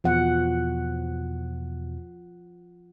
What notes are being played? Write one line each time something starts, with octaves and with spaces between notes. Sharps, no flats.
E2 B2 F3 F#5